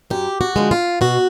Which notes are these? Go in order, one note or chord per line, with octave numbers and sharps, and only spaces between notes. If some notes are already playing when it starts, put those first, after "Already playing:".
F#2 G4
F#4
D3 F3 G#3
F4
B2 F#4